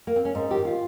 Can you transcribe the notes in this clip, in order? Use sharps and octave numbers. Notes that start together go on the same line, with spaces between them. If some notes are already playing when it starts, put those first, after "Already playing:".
A#3
C4
C#4
G#2 D#4
D#3 G4
F4